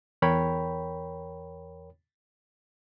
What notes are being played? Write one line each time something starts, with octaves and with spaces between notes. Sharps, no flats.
E2 A#4 C#5 G5 B5